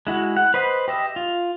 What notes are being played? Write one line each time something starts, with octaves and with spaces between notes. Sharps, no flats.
G#3 E4 F#4
F#5
B4 C5 D#5 B5
G4 D#5 E5
F4